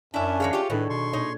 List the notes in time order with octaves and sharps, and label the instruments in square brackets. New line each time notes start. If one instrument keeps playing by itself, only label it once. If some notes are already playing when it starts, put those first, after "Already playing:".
[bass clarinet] F#2 [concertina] C#4 D4 [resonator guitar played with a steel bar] E4 E5
[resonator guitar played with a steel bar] E3 C#5 F5 [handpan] G#4
[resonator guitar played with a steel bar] F4 C#5 [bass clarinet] G4
[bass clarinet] A2 [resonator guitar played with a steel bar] D#3 [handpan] D4 A4 C#5 [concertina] B4
[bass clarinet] B2 [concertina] C6 C#6
[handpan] A#2 C#5 [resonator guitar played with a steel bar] D#4